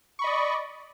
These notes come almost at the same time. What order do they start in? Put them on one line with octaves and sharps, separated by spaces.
C#6 B5 D#5 D5